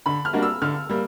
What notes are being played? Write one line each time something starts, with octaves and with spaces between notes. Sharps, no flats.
D3 B5
F6
G3 A#3 D4 F#4
E6
D3 F6
G3 A#3